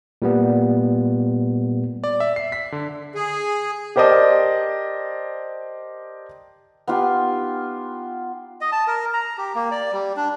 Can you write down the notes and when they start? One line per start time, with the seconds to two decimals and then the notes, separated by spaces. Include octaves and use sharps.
0.22 A#2 G3 B3
2.04 D5
2.20 E5
2.36 C7
2.52 B6
2.72 D3
3.15 G#4
3.96 G4 A#4 C5 D5 D#5 A5
6.87 B3 D#4 F4 G4
8.61 D#5
8.72 A5
8.87 A#4
9.14 A#5
9.38 G4
9.55 A#3
9.71 D5
9.92 G3
10.17 D4